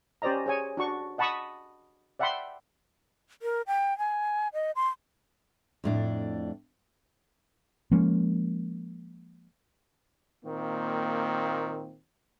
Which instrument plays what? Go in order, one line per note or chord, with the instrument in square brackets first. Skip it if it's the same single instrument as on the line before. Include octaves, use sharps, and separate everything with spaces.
[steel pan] C#4 G4 C5 D5 D#5 A#5
G#4 C#5 G#5
D4 F#4 C#6
D#5 F#5 A5 B5 C#6 D#6
D5 E5 F#5 G5 B5 C6
[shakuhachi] A#4
G5
G#5
D#5
C6
[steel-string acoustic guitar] F2 A2 D4
[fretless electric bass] F3 G#3 A#3 C#4
[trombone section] A#2 D#3 A#3 C4